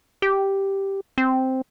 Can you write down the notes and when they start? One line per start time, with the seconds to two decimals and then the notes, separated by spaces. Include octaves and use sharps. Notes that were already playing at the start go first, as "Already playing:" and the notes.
0.22 G4
1.18 C4